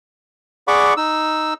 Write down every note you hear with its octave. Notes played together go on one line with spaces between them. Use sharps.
G#4 D5 F#5 B5 C#6 D6
D#4 E6